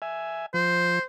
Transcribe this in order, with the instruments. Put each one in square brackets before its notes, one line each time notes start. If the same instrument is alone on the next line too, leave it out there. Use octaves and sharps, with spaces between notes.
[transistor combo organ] E5 G#5
[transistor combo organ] F3 [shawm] C5